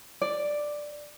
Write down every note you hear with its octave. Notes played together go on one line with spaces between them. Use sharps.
D5